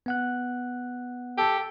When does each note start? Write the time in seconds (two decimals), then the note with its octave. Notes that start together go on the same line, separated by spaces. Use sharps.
0.06 B3 F#5 F#6
1.38 G4 A4